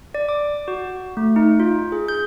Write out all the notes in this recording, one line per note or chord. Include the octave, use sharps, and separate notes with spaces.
D5
D6
F#4
A3
D#4
F4
G#4
G6